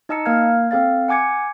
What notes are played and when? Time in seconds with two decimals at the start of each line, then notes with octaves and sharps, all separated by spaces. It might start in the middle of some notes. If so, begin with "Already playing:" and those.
0.09 D#4 D#5 A5 E6 C#7
0.26 A#3 A#4 F5 F6 G#6
0.71 C4 A4 F5 A6
1.08 F#5 G#5 D6 G#6 C#7